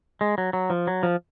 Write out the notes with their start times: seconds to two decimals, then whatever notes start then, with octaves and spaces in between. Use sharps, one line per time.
0.21 G#3
0.38 F#3
0.53 F#3
0.70 F3
0.87 F#3
1.03 F3